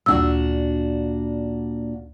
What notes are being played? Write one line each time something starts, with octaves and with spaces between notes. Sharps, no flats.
D2 A#2 D4 F#4 E6